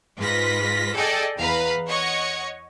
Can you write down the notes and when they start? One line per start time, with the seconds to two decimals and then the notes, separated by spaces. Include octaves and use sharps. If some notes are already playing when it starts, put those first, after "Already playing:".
0.19 G#2 F4 B4 A#6 B6
0.95 G#4 A4 D5 D#5 G5 G#5
1.36 E2 B4 F5 A#5 B5
1.89 C#5 D#5 F#5 C#6